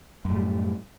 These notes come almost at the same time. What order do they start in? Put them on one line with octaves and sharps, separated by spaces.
F#2 A2 G3